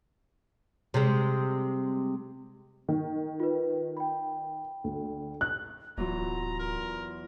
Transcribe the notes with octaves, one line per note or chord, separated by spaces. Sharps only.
C3 G3 G#3
D#3
F4 B4
G5 B5
D2
F#6
D1 E2 F#3 F4 A#5
A#4